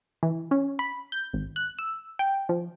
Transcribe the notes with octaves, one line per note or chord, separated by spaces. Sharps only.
E3
C#4
B5
G6
G#1
F#6
E6
G5
F3